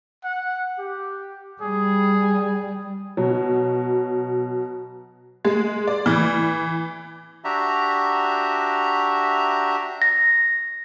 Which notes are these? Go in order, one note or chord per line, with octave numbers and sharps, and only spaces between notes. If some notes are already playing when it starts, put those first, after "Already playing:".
F#5
G4
G3 G#4
B2 F#3
G#3
D5
E3
D4 F#4 G4 E5 A#5
A#6